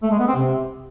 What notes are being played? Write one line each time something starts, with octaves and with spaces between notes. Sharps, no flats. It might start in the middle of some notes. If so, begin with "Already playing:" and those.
A3
G#3
B3
C4
C3